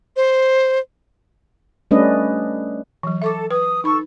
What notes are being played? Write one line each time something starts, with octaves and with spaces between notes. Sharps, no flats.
C5
G3 A3 C#4 D4 B4 D#5
E3 F#3
A4 E5 C#6 D6
B4 D#6
D#4 A4 B5 C#6